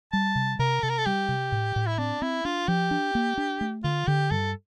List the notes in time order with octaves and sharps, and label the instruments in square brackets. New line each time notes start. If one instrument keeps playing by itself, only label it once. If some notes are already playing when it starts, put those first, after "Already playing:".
[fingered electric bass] G3 [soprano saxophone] A5
[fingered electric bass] C3
[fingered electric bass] C3 [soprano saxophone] A#4
[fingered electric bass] C3 [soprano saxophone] A4
[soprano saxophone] A#4
A4
[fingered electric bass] G3 [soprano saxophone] G4
[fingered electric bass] C3
A2
A2
[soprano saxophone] E4
[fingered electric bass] C4 [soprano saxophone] D4
[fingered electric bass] C4 [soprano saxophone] E4
[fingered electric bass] D4 [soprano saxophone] F4
[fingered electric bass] F3 [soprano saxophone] G4
[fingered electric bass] D4
A#3
D4
A3
[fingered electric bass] D3 [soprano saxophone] F4
[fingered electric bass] D3 [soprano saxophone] G4
[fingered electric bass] G2 [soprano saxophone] A4